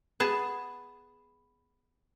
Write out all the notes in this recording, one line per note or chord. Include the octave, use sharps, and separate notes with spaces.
B3 G#4 A5